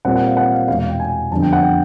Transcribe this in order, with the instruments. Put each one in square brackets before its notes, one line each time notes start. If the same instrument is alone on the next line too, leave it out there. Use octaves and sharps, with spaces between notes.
[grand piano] A#2 G3 C4 F#5
F#5
F5
F#5
F5
E2 B2 G#3 B3 F5
F5
G5
G#5
F2 D3 G3 B3 D4 A5
G5
F#5
G5